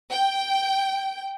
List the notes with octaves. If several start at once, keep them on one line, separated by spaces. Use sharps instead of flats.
G5